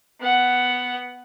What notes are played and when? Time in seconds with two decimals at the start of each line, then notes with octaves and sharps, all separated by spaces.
0.21 B3 F#5